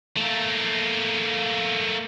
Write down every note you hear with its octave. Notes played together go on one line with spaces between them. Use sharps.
A3 A#3